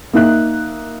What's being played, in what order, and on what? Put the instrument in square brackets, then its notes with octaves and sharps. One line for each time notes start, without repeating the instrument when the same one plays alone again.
[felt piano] A#3 D#4 E5 F#6